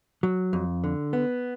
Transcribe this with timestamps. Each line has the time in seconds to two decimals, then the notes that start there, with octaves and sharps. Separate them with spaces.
0.23 F#3
0.53 F2
0.84 D3
1.13 B3